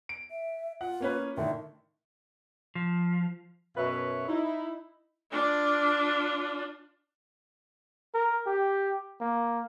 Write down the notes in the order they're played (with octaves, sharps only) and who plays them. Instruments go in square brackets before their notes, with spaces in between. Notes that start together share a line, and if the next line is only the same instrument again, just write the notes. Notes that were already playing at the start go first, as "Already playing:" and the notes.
[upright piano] D7
[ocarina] E5
[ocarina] F4 [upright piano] F#5
[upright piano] A#3 C#4 B4
[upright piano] A2 D3 D#3 [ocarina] E5
[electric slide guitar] F3
[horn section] F#2 B2 B4 C#5 E5
D#4 E4
[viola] D4 F4
[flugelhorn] A#4
G4
A#3